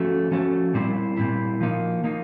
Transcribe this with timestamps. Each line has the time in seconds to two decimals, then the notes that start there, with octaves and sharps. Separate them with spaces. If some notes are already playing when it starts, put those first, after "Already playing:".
Already playing: F3 A3 C#4 F#4 A4
0.31 F3 A3 C#4 F#4 A4
0.74 A#2 G3 C4 E4
1.17 A#2 G3 C4 E4
1.61 F3 A#3 D#4
2.04 F3 A#3 D#4